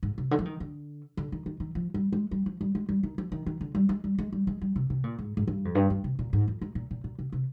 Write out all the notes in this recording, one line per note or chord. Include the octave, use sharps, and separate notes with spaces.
G#2
C3
D3
F3
D#3
D3
D3
D#3
D#3
D#3
F3
G3
G#3
G3
F3
G3
G#3
G3
D#3
F3
D#3
D#3
D3
G3
G#3
G3
G#3
G3
G#3
G3
C3
C3
A#2
G#2
G#2
G2
F2
G2
G2
C3
A#2
G#2
F2
G#2
A#2
A#2
A#2
C3
C3